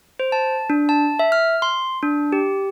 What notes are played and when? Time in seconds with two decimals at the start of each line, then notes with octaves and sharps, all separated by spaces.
0.20 C5
0.32 A5
0.70 D4
0.89 A5
1.19 E5
1.32 F6
1.62 C6
2.03 D4
2.32 G4